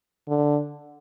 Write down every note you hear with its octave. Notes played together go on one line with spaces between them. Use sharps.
D3